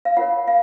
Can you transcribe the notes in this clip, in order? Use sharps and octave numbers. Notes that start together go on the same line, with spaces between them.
F5
F4 A#4 C#5 F#5
F5